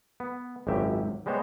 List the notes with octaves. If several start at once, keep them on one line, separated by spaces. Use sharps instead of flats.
B3
G#1 C#2 F#2 G4 E5
G3 G#3 B3 C5 C#5 D#5